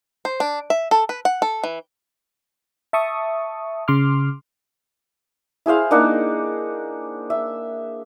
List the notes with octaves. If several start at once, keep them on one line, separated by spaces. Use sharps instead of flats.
C5
D4
E5
A4
B4
F#5
A4
E3
E5 A5 C#6 D#6
C#3 C6 D6 F6
E4 G#4 C5 F5
A#3 D4 D#4 F#5
E5